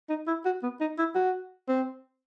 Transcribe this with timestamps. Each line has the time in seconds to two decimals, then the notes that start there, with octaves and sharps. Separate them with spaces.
0.09 D#4
0.27 E4
0.45 F#4
0.63 B3
0.81 D#4
0.98 E4
1.15 F#4
1.68 C4